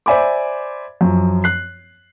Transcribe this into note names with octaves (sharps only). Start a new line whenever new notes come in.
C5 D5 E5 G#5 B5 D6
F#2 F3
F#6 C7